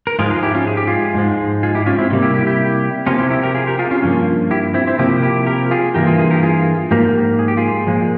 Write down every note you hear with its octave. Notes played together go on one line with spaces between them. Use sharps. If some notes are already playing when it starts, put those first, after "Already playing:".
A#4
G#2 F3 G#3 F4 G#4
F4 G#4
E4 G4
C#4 F4
G#4
G4
F4 G#4
G#2 F3 G#3
F4 G#4
E4 G4
C#4 F4
C4 E4
C3 G3 A#3 C#4
E4 G4
E4 G4
E4 G4
C3 F3 A#3 C#4 F4
E4 G4
E4 G4
G4 A#4
F4 G#4
G4 A#4
F4 G#4
C#4 F4
G2 F3 A#3 C#4 F4
E4 G4
C4 E4
C4 E4
C3 F3 A#3 E4 G4
E4 G4
G4 A#4
F4 G#4
G2 E3 A#3 G4 A#4
F4 G#4
F4 G#4
G4 A#4
F4 G#4
G#2 F3 A#3 G4 A#4
G#4
G4
F4 G#4
A#2 F3 G#3